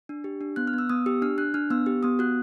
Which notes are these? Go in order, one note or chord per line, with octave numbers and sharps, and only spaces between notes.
D4
G4
D4
B3 F#6
F6
B3
E6
B3 D#6
G4 E6
D4 F6
D4 F#6
D4 F6
B3 E6
G4
B3 D#6
F#4 F#6